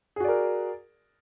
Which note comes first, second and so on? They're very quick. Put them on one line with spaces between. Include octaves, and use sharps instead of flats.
G#4 F#4 D5 A#4